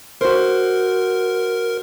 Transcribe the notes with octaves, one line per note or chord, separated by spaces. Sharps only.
F#4 A#4 C5